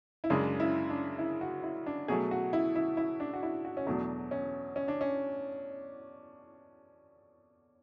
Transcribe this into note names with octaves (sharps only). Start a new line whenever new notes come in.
E4
F#2 C#3 G#3 D4
E4
D4
E4
F#4
E4
D4
B2 F#3 A3 G#4
F#4
E4
E4
E4
D4
F#4
E4
F#4
C#4
E2 B2 F#3 A3 D4
C#4
C#4
D4
C#4